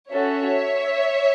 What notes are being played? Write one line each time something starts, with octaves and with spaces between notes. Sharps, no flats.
C#4 F#4 A4 C#5 E5